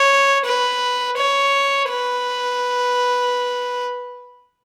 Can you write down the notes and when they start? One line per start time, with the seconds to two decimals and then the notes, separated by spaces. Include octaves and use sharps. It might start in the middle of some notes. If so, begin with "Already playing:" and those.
Already playing: C#5
0.45 B4
1.17 C#5
1.89 B4